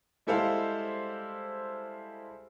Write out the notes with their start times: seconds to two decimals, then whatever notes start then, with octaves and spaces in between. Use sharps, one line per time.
0.27 G3 G#3 E4 A4 C5 F5